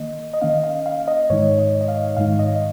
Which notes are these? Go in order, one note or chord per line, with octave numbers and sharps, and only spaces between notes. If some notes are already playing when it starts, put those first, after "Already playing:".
Already playing: D#3 A#3 D#5
D#5
D#3 A#3 C#4 F5
F5
F5
D#5
G#2 D#3 G#3 D#4 C#5
D#5
D#5
F5
G#2 D#3 G#3 D#4 F5
D#5